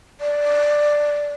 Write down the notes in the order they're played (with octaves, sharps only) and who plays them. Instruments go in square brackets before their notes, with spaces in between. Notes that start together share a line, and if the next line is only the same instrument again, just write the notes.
[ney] D5